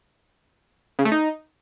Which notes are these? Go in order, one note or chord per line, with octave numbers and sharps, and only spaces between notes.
C#3
A3
D#4